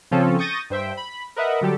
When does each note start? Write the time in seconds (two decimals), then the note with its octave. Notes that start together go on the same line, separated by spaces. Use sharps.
0.11 C#3 F3 C4 C#4 F4 A4
0.39 C#6 D#6 G6 A6 A#6 D#7
0.70 G2 C5 E5 G5
0.97 B5
1.36 A#4 B4 D#5 E5 F#5
1.61 D3 F#3 G3 G4 A4